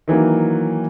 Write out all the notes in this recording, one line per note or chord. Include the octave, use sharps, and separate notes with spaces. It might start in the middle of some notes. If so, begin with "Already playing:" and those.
D#3 E3 F#3 A#3